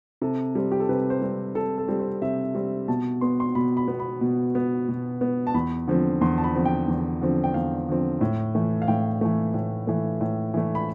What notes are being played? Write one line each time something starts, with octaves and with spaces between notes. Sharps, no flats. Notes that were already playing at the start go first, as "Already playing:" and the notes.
C3 A4
G3 C4
G4
A4
C3 B4
C5
G3 C4
C3 A4
A4
G3 C4
C5
C3 E5
G3 C4
B2 A5
B3 C6
C6
B2 B5
B5
B3
B5
B2
B3
B2
B3
A5
E2 B5
D3 F3 C4
E2 C6
A5
B5
D3 F3 C4
G5
E2
D3 F3 C4
G5
E2 F5
D3 F3 C4
A2
E3 A3
F5
A2 G5
E3 A3
A2
E3 A3
A2
E3 A3
B5